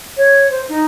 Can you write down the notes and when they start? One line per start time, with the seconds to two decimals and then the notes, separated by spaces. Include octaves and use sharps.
0.17 C#5
0.50 C5
0.69 D#4